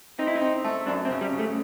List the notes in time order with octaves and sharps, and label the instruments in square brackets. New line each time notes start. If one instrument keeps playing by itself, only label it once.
[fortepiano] C4 [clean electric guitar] D#4
[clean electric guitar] E4
D#4
[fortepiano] C4
A3
[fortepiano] F#2 [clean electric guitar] D4
[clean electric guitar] C4
[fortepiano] C#3
[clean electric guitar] G3
[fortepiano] C#3
[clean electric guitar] A3